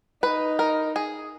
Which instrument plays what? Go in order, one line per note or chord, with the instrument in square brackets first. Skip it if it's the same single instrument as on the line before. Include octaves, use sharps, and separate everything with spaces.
[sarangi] D#4 [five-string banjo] B4
[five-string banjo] A#4
G#4